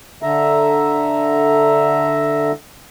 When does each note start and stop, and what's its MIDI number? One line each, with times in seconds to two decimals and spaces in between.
0.22 2.51 50
0.22 2.51 76
0.22 2.51 82